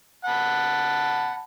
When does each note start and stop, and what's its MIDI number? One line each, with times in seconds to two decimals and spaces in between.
0.25 1.44 78
0.25 1.44 81
0.25 1.44 83